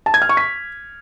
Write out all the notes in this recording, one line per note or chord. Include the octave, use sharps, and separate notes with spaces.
A5
G#6
F6
C#6
B6